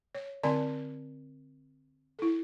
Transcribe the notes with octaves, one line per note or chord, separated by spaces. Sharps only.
C#5
D3 C4 D5 G#5 C6
E4 A4